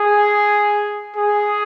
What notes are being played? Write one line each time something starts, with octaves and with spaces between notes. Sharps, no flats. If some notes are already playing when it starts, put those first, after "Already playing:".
Already playing: G#4
G#4